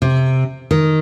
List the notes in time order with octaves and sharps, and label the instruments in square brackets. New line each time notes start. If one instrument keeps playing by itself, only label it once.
[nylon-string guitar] C3
D#3